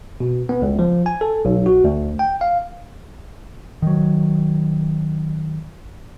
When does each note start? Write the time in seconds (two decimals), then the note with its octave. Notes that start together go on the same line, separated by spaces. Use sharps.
0.20 B2
0.49 B3
0.62 C#2
0.79 F3
1.06 G#5
1.21 A4
1.45 B1
1.66 F#4
1.84 D2
2.19 G5
2.41 F5
3.82 D#3 F#3